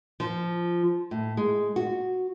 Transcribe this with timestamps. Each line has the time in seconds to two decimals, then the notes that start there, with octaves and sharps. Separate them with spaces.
0.20 F3
1.11 A2
1.37 G#3
1.76 F#4